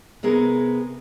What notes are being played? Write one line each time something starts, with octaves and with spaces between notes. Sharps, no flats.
C3 B3 G#4 A#4